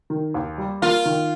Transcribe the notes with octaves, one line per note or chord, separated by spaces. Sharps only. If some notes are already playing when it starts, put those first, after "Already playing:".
D#3
D#2
G3
A#3 F4
D#3